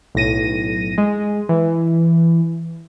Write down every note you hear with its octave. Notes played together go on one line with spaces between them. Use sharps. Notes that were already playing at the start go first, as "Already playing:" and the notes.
B1 A2 A#6 D#7
G#3
E3